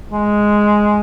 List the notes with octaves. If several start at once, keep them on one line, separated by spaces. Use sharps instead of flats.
G#3